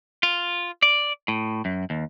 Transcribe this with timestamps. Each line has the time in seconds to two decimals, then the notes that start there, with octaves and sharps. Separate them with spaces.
0.23 F4
0.82 D5
1.28 A2
1.65 F#2
1.90 D#2